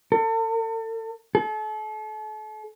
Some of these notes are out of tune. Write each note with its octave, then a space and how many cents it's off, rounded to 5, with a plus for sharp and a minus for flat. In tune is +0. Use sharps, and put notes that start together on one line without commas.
A4 +40
A4 -40